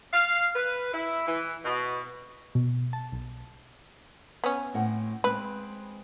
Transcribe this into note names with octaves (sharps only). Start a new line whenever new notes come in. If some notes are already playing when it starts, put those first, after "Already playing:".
F5
B4
E4
E3
B2
B2
A5
B1
B3 C#4
A2 C4 F#5
G#3 C4 B4